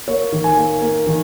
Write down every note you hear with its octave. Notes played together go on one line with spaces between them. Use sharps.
A#3 C#5
D#3
G#5
A#3
A#3
D#3